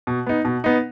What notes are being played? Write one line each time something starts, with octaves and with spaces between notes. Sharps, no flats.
B2
B3 D#4
B2
B3 D#4